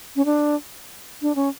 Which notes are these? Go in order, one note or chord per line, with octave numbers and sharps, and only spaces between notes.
C#4
D4
D4
C#4